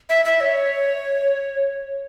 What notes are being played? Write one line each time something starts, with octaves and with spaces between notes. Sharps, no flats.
E5
E5
C#5